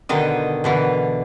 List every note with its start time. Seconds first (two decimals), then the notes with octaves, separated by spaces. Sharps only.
0.09 B2 D3 D#3 D#5
0.64 B2 D3 E3